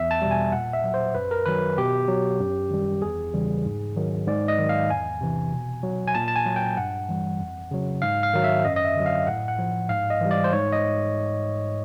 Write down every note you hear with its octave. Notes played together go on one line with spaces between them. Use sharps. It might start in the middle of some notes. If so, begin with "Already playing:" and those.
Already playing: E2 E5
A5
B2 G3
G#5
A#2 F#5
E5
F#3
C5
F#2 B4
A#4
D#3 F#3 B4
B2 G4
F#3
F#2
D#3 G3
E2 G#4
C#3 E3 G3
G#2
D#3 F#3
G#2 D5
D#5
D#3 F#3
F5
E2 G#5
C3 E3
B2
F#3
G#5
A#2 A5
A5
G#5
F#3
G5
G2 F#5
E3 G3
F2
C#3 F#3
G#2 F5
F5
D#3 F#3
E5
F#2 D#5
D#5
E5
D3 F#3
F5
A2 F#5
F#5
F3
G#2 F5
D#5
E3 G3
D5
C5
G#2 C#5
D#5